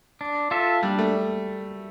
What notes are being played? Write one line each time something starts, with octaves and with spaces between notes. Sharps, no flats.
D4
F4 A4 E5
G3 D4
A3